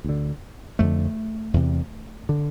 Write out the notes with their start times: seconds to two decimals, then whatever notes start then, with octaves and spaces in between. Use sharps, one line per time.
0.04 D2 D3
0.79 F2 D3 A3
1.54 E2 C3
2.29 D3